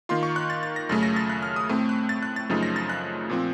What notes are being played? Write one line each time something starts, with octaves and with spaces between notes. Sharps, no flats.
D#3 A#3 F4 C6
C#6
F#6
A6
A6
A#6
F#2 C#3 A3 A6
A#6
A6
F#6
F6
D#6
A2 A3 C4
F#6
A6
F#6
A6
F#2 C#3 F3 A3 D#4
A#6
A6
F#6
A#2 F3 C4